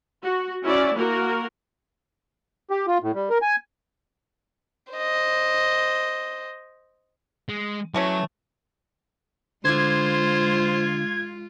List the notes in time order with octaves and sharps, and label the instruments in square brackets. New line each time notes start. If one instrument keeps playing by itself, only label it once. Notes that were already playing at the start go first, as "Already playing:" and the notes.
[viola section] F#4
C#4 E4 F#4 D5
A#3 F#4 A#4
[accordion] G4
F4
A2
G3
A#4
G#5
[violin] C5 D#5
[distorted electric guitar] G#3
[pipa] E3 A3 C#4 [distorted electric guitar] F#3
[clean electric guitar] D3 [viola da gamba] G#3 F4 [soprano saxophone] C5 [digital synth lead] G#6